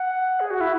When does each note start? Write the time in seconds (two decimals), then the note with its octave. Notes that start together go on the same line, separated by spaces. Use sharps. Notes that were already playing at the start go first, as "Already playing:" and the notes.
Already playing: F#5
0.40 G#4
0.50 F#4
0.61 E4